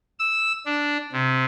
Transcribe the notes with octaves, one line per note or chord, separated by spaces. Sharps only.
E6
D4
C3